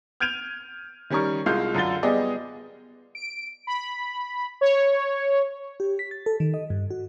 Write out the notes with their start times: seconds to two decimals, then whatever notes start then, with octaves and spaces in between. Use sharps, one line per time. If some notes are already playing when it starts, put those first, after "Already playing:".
0.20 F6 G6 G#6 D7 D#7 F7
1.10 D#3 G3 C#4 A#4 C#6
1.46 C2 G#3 F4 F5 G6
1.75 F#2 D3 F4 A6 G7
2.03 G3 B3 G4 G#4 D5 D#5
3.15 D7
3.67 B5
4.61 C#5
5.80 G4
5.99 B6
6.11 A6
6.26 A4
6.40 D#3
6.54 D#5
6.70 G2
6.91 F#4